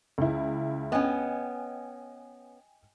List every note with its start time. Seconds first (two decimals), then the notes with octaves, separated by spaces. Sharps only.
0.18 C#2 E4
0.92 B3 C#4 D#5 G5 G#5